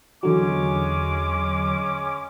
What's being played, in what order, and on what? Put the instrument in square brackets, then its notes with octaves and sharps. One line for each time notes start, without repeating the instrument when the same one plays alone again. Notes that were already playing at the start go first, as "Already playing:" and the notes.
[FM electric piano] E2 D3 F#3 [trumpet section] G#3 C#4 D6